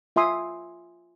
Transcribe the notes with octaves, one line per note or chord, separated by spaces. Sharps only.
F4 E5 G#5 C6 D#6